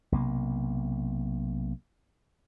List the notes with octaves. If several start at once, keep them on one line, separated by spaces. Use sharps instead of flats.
B1 C3 A#3